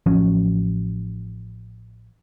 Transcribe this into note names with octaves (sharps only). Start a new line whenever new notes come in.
A1 F3 F#3 C#4